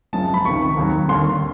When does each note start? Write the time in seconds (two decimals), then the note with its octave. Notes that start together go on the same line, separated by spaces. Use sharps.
0.13 F#1 F#2 C#3 F3 G#3 A5
0.34 B5
0.45 C#2 C3 D#3 C#6
0.77 D#2 D#3 F#3
1.08 D#2 D3 G3 C6